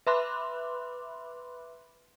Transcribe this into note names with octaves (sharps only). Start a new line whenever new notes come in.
B4 E5 B5 C6 D6 F#6